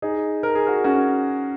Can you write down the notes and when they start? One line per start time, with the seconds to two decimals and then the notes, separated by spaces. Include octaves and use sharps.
0.02 D#4 G#4
0.43 A#4
0.55 G#4
0.67 F#4 A#4
0.84 C#4 F#4